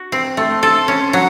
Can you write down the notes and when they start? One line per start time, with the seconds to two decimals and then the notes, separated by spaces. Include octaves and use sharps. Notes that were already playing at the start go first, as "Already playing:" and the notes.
Already playing: F#4
0.12 C4
0.37 A3 C6
0.63 A4
0.88 C#4
1.13 F#3 F#5